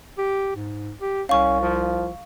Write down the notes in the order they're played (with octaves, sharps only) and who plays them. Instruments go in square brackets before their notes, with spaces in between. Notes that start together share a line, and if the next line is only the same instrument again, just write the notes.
[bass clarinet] G4
G#2
G4
[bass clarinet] C2 [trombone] C#4 [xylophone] F5 C#6
[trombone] F3